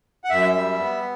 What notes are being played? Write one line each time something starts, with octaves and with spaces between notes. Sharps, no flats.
F#5
F#2 E5
G3
B3